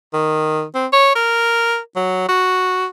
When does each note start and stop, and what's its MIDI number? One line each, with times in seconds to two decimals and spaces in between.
0.14 0.63 51
0.75 0.87 60
0.93 1.12 73
1.15 1.78 70
1.96 2.25 54
2.28 2.86 66